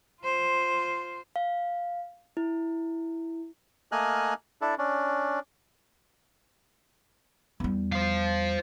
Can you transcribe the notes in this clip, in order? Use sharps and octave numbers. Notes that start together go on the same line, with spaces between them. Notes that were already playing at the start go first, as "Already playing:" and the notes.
F4 C5
F5
E4
A3 A#3 D#5 G#5 F6 F#6
D4 E4 A4
C#4 D4
E2 G3
C5 F5